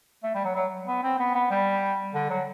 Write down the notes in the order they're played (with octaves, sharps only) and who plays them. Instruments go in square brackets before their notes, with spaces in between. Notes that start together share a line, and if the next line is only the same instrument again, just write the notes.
[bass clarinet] A3
G3
F#3
F#3
B3
C4
B3
B3
G3
D3
F#3